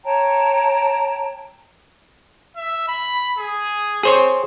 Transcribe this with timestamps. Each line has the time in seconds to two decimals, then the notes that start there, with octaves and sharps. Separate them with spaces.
0.05 C#5 G5 A5 A#5
2.56 E5
2.88 B5
3.38 G#4
4.03 C4 G#4 C5 C#5